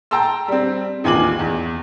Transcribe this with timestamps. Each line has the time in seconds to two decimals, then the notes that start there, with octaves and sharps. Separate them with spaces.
0.11 G5 A5 A#5 C6 E6
0.48 G3 C4
1.04 A1 D#2 F4 G#5 D6 F#7
1.39 E2